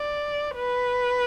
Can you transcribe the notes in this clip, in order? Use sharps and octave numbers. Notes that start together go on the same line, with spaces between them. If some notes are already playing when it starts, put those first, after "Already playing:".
Already playing: D5
B4